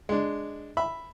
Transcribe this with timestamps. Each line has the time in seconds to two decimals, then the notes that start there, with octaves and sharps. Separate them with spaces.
0.09 G#3 D4
0.77 E5 B5